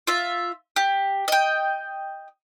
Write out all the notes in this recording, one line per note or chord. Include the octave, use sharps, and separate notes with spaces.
F4 E5
G4
D#5 G5